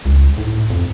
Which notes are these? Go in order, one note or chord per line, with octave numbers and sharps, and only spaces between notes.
C#2
A2
F2